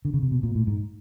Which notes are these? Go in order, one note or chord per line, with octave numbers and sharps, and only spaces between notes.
D3
C#3
C3
B2
A#2
A2
G#2